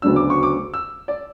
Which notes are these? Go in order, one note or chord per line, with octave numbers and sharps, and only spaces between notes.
D2 C#3 F#3 B3 D4 E6
D6
C#6
D6
E6
D5